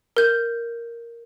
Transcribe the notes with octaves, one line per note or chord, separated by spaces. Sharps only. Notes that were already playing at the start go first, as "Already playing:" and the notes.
A#4 G6